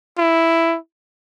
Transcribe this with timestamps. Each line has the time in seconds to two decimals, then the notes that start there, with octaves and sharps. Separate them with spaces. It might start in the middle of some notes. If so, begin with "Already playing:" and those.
0.18 E4